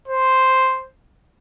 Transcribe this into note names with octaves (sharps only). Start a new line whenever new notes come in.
C5